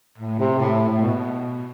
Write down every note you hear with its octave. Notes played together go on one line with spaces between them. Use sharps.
A2
C3
A2
A2
B2